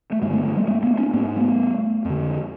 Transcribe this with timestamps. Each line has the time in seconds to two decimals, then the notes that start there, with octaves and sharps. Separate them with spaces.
0.12 A3
0.22 G2 G#3 A#3
0.27 D3
0.33 A3 B3
0.45 G#3 A#3
0.56 G3 A3
0.68 G#3 A#3
0.83 A3 B3
0.98 C4 D4
1.14 G#2 A#3 C4
1.36 A3 B3
2.05 F2 D3